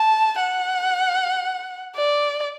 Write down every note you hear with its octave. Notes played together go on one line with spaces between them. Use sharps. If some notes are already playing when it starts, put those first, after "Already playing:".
Already playing: A5
F#5
D5